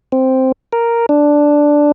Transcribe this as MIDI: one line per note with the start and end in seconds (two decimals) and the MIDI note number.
0.12 0.52 60
0.73 1.06 70
1.09 1.92 62